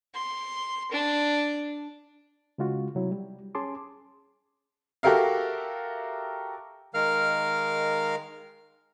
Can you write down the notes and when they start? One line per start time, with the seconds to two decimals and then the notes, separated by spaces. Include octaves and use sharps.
0.14 C6
0.92 D4
2.58 C#3 G#3 F4 F#4
2.95 C3 F#3 E4
3.12 G3
3.55 C#4 G#4 A5 C6 D6
5.03 F#4 G4 A4 A#4 E5 F5
6.94 D#3 G#3 A#4 F5 F6